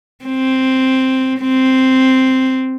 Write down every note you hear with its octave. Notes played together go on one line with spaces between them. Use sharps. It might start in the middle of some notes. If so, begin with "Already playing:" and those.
C4
C4